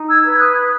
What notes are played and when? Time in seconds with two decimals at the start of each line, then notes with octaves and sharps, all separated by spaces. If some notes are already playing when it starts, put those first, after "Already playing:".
Already playing: D#4
0.09 E6 G#6
0.25 B4
0.34 G#6
0.39 D#6 F#6